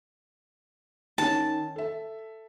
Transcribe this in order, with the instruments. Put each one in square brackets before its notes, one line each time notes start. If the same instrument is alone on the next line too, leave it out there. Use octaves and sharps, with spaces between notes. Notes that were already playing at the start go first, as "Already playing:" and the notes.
[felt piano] D#3 C#4 [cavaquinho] A5
[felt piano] A4 E5